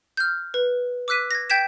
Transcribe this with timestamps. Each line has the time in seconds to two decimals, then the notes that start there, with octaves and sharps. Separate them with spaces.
0.17 F6 G6
0.54 B4
1.08 D6 E6 F#6 B6 D#7
1.31 G#6 A#6
1.50 G5 G6 G#6 B6 E7